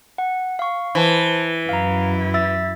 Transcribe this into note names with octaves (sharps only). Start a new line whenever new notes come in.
F#5
F5 C#6
E3 C5 A5
F#2 E4 F5 A#5
E5 E6 A6